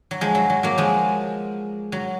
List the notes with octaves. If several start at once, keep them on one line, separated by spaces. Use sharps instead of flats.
F#3
F3 G#3
F#3
F#3
F#3 A#3
F3 G#3
F#3